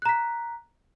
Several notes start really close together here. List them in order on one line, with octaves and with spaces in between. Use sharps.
F#6 A#5 B6